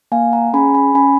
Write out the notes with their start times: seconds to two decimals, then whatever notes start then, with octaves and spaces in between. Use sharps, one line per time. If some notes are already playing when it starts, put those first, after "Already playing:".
0.12 A#3 F5 G#5
0.33 F#5 A#5
0.53 C#4 G#4 G#5 B5
0.74 G#5 B5
0.95 C#4 G#5 B5